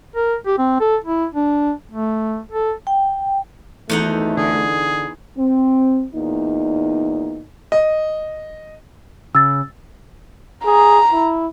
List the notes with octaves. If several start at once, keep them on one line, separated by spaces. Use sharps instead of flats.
A#4
G4
C4
A4
E4
D4
A3
A4
G5
G#1 E2 A3 D#4 F#5
D3 G#4
C4
E2 A#2 D#4
D#5
C#3 E6 A6
G#4 A#5
E4